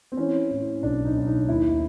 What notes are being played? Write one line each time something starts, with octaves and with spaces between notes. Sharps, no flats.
C4
E3 C#4
A2
B1 D4
D#4
B1
D#4
D#2 E4